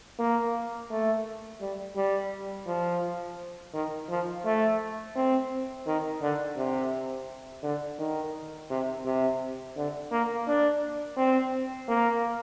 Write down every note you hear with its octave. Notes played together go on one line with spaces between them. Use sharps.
A#3
A3
G3
G3
F3
D#3
F3
A3
C4
D#3
D3
C3
D3
D#3
C3
C3
D3
A#3
D4
C4
A#3